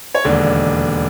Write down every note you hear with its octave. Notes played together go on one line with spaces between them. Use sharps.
C#5
E1 D#2 D3 D5